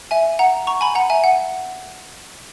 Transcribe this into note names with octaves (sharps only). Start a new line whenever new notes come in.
E5 G#5
F#5 A#5
A#5 C#6
G#5 B5
F#5 A#5
E5 G#5
F#5